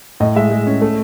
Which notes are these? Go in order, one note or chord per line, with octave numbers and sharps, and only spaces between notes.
A2 D#5
G#3 E5
G#3
C#4
A3